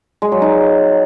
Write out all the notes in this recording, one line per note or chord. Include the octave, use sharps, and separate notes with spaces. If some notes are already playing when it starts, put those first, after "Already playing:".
G#3
F#3
D#4